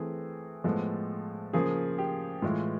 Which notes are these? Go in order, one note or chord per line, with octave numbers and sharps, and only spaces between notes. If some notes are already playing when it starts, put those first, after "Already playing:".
Already playing: E3 A3 C4 G#4
A2 F3 G#3 B3 A4
C#3 F3 A#3 G#4
G4
A2 E3 G#3 F4